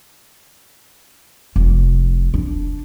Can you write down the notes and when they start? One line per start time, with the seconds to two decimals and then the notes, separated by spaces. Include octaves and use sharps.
1.56 F1
2.34 D4